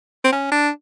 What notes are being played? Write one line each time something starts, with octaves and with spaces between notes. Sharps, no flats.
C4
C#4
D4